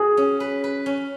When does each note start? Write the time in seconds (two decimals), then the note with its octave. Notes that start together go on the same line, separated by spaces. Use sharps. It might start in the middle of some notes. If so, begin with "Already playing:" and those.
Already playing: F#4 G#4
0.17 C#4
0.40 B4
0.64 B4
0.86 C#4